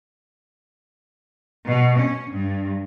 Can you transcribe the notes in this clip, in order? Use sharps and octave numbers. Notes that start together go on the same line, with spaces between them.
B2
C#4
G2